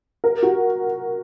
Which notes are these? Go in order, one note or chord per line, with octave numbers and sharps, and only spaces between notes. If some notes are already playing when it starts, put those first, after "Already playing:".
A#4
F#4